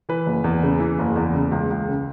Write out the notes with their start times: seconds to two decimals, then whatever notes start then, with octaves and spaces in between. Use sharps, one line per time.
0.09 E3 B4
0.26 F#1
0.44 E2
0.63 C#3
0.80 E3
0.99 F#1
1.16 E2
1.35 C#3
1.52 C#2
1.70 C#2
1.89 C#3